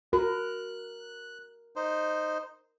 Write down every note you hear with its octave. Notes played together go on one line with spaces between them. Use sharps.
F#4 A#4 F#6
D#4 C5